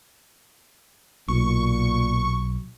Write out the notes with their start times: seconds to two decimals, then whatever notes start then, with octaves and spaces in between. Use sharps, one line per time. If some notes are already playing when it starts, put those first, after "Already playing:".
1.28 B1 A#2 C#6